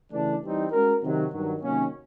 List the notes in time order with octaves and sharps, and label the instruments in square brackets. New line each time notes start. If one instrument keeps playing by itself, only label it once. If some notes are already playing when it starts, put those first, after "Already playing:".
[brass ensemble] C#3 E3 A3 D4
E3 G3 C4 D#4
G#3 C#4 F#4 A#4
C3 D#3 F#3
G2 D#3 F#3
C3 D#3 F#3 A#3 C#4